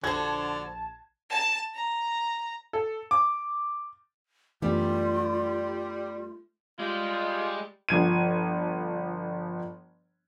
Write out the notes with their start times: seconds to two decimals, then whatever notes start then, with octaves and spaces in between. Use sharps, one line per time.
0.04 A#1 D3 F#4 C5 A5 G#6
1.30 A5
1.75 A#5
2.73 A4
3.11 D6
4.62 F#2 E3 G3 A3 B3 D4 F4
6.79 G3 G#3 F4
7.89 G1 F3 G#6 D#7